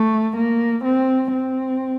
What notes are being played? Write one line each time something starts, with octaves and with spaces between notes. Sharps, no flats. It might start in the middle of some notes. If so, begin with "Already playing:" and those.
Already playing: A3
A#3
C4
C4